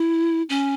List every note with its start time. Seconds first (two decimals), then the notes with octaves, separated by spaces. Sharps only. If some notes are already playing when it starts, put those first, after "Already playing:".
Already playing: E4
0.50 C#4